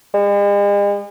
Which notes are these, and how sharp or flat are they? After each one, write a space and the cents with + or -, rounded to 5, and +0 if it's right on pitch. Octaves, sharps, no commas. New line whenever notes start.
G#3 -45